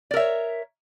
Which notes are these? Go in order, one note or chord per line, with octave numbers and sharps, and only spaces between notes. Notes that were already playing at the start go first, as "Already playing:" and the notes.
A#4 C#5 D5 E5